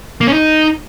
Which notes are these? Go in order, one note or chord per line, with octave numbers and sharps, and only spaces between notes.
A#3
C#4
D#4